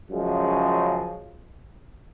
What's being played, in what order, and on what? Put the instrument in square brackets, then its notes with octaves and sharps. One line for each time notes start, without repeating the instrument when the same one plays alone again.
[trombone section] F#2 C#3 F3 G#3